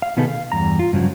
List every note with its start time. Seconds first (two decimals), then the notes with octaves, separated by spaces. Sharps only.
0.02 F5
0.17 B2 D#3 B3 D#4 G#4 A4
0.28 F5
0.52 E2 G2 A#5
0.79 F4
0.93 G2 C#3 F3 F#3